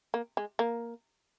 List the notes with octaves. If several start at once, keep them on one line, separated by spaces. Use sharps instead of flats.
A#3
G#3
A#3